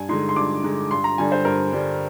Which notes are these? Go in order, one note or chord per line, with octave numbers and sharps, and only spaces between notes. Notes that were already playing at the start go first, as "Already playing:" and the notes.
Already playing: G2 G#5
D3 G#3 D#4 C6
C6
G2 D6
D3 G#3 D#4
G2 C6
A#5
D3 G3 D4 G#5
C5
G2 A#4
D3 G3 D4